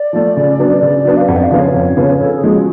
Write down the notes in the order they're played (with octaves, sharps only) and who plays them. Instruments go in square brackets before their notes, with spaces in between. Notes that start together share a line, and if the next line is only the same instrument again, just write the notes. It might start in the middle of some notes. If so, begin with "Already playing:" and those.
Already playing: [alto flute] D5
[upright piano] F3 A3
C#3
F#3 B3 D4
[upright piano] C#3 [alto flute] D5
[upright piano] F#3 B3 D4
[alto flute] F5
[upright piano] F2 [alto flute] F#5
[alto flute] D5
F5
[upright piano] C#3 F3 B3 F4
[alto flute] C#5
[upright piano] F2
C#3 F3 B3 F4
[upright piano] C#3 [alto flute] A4
[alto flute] G#4
[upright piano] F3 G#3
[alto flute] F#4